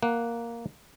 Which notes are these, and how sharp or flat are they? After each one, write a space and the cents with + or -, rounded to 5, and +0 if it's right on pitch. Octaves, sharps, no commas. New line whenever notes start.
A#3 +0 F#5 +0